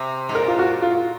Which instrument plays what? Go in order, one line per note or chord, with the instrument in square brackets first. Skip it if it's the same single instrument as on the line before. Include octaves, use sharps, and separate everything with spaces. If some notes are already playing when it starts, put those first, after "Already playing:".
Already playing: [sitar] C3
G#2
[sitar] A#2 [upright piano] A#4
[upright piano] F4
F#4
F4